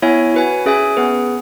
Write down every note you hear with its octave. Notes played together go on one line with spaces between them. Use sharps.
B3 E4 C#5 E5 G#5
F#4 B4 G#5
C#4 G#4 E5 G#5
B3 G#4 B4